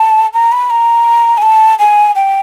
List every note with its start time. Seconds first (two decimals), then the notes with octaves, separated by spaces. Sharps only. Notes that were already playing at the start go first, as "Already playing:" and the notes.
Already playing: A5
0.34 A#5
0.52 B5
0.70 A#5
1.38 G#5
1.42 A5
1.79 G#5
2.15 G5